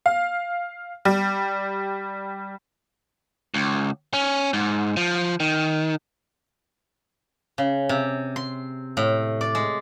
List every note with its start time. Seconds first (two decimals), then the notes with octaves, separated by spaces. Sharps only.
0.06 F5
1.05 G3
3.54 C#2
4.13 C#4
4.53 G#2
4.97 F3
5.40 D#3
7.58 C#3
7.89 C3
8.36 C6
8.97 A2
9.41 D5
9.55 G#3